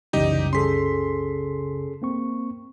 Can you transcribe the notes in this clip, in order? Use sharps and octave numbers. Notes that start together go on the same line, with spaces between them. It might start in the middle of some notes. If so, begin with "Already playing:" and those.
C2 F#2 C#3 E3 G3 D#4 G4 D#5
C#4 G#4 A4 C6 B6
A#3 C4 C#6